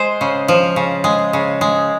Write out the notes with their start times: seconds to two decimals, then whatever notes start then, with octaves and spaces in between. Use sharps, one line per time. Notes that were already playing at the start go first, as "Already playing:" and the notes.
Already playing: G#3 C5
0.21 C#3
0.48 F3
0.76 C#3
1.04 G#3
1.33 C#3
1.61 G#3